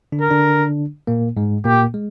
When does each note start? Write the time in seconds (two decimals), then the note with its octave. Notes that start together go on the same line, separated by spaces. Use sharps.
0.12 D3 D4
0.21 A#4
0.31 D3 D4
1.07 A#2 A#3
1.37 G#2 G#3
1.65 A#2 A#3 G4
1.94 G#3